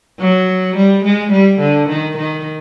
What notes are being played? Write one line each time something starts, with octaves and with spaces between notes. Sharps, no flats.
F#3
G3
G#3
G3
D3
D#3
D#3